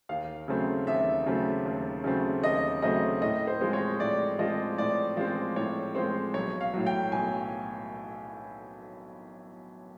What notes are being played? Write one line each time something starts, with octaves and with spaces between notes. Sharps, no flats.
D#2 F5
C#3 F#3 A3 C4
D#2 E5
C#3 F#3 A3 C4
D#2
C#3 F#3 A3 C4
D#2 D#5
C#3 F#3 A3 C4 D#5
A2 D#5
C5
F3 G#3 C4
C#5
A2 D5
F3 G#3 C4 D#5
A2 D5
F3 G#3 C4
A2 C#5
F3 G#3 C4 C5
B1 C#5
F5
A2 F#3
G5
B1 G#5